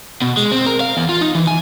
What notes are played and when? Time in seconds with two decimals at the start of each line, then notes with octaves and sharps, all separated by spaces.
0.22 B2
0.37 G#3
0.51 C4
0.66 A#4
0.80 F5
0.97 E2
1.09 F4
1.21 D#4
1.35 E3
1.47 G#5